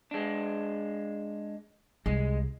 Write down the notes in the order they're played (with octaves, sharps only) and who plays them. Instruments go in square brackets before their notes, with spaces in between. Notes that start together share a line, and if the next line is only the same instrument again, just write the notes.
[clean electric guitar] G#3 D4
[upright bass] C2 [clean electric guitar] G#3